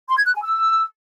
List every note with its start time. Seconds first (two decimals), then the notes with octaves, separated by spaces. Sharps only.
0.09 C6
0.17 G#6
0.26 F#6
0.34 G#5
0.43 E6